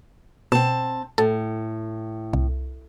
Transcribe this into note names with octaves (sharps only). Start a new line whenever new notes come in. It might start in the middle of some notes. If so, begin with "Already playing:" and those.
B2 C4 A5
A2 A4
C2